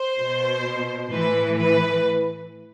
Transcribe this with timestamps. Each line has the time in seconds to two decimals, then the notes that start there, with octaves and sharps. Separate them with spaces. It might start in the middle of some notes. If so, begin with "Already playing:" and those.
Already playing: C5
0.19 B2
1.11 A2 E3 B4
1.57 B4